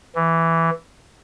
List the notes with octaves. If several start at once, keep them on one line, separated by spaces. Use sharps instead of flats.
E3